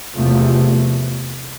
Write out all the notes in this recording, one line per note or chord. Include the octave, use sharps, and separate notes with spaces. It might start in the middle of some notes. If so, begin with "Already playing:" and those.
E2 C3 F3 A3